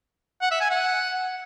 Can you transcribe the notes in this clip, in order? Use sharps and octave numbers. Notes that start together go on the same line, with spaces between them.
F#5
E5
G#5
F#5